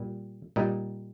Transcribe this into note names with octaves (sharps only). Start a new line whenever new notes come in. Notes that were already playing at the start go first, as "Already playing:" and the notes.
Already playing: A#2 G3
A#2 G3 D#4